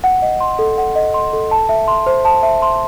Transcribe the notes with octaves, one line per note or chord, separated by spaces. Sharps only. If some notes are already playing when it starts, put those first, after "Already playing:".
F#5
D#5
C6
A4
F#5
D#5
C6
A4
A5
E5
C6
C5
A5
E5
C6